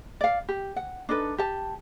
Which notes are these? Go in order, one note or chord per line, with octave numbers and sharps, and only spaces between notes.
D5 F5
G4
F#5
D4 D#4 A4 B4
G4 A5